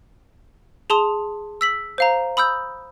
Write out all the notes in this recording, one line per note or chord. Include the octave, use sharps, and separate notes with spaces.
G#4 A5 C6 D#6 F7
E6 B6 F#7
C5 F5 A#5
B5 D#6 E6 G6